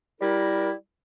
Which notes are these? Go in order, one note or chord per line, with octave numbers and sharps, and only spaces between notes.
G3 E4 A#4